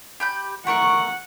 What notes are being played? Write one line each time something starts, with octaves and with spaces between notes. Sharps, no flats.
G4 B5 G6
A3 A#4 F#5 C#6